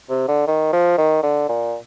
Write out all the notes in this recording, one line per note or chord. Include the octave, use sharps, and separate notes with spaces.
C3
D3
D#3
F3
D#3
D3
A#2